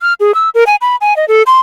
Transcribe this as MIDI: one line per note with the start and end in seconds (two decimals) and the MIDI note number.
0.01 0.14 89
0.20 0.34 68
0.34 0.49 88
0.55 0.64 70
0.67 0.76 80
0.81 0.96 83
1.01 1.16 80
1.16 1.25 75
1.28 1.43 69
1.46 1.61 84